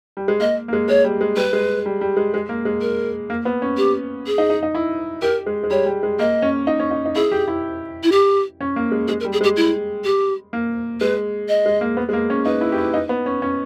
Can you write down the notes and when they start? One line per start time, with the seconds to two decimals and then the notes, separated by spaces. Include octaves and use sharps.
0.17 G3
0.28 G#3
0.40 A#3 D#5
0.68 A#3
0.73 G#3
0.89 G#3 C#5
1.04 G3
1.21 G#3
1.36 G3 B4
1.53 G#3
1.86 G3
2.01 G3
2.17 G#3
2.34 G#3
2.49 A#3
2.65 G#3
2.81 A#4
3.30 A#3
3.45 B3
3.62 C#4
3.77 G4
4.27 G#4
4.38 D#4
4.50 D#4
4.63 D#4
4.75 E4
5.22 G4 A#4
5.46 G#3
5.64 G#3
5.71 G3 C#5
5.86 G3
6.03 G#3
6.19 A#3 D#5
6.42 C#4
6.67 D#4
6.80 C#4
6.91 D#4
7.06 D#4
7.15 E4 G#4
7.32 G4
7.48 E4
8.04 E4
8.12 G4
8.61 C#4
8.76 A#3
8.91 G#3
9.08 G#3 G#4
9.20 A#4
9.25 G3
9.33 G#4
9.41 G#3 G4
9.57 E4
10.04 G4
10.53 A#3
11.01 G#3 B4
11.49 D#5
11.66 G#3
11.81 A#3
11.97 B3
12.09 G#3
12.13 A#3
12.30 C#4
12.45 D#4 B4
12.61 E4
12.72 G4
12.78 E4
12.94 D#4
13.09 B3
13.26 C#4
13.42 C#4